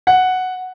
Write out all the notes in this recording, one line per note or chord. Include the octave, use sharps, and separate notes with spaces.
F#5